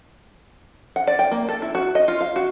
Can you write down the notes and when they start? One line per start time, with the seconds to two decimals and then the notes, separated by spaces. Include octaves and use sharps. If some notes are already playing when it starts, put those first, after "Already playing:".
0.96 F#5
1.07 D5
1.19 G5
1.31 A#3
1.49 A4
1.62 E4
1.75 F#4
1.95 D#5
2.08 F4
2.21 F5
2.36 F#4